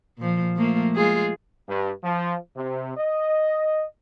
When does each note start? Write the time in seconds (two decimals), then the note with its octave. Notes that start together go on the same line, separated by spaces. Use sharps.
0.18 A#2 F3
0.56 F3 A3 A#3
0.96 G#3 F4 G#4
1.68 G2
2.04 F3
2.56 C3
2.97 D#5